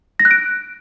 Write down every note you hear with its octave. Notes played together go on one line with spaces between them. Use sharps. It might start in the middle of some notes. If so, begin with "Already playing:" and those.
A#6
F#6
D7